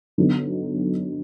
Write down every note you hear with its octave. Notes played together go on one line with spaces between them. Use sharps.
D3 F#3 B3 D#4